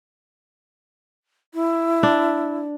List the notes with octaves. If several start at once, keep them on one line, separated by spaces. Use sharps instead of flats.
E4
D4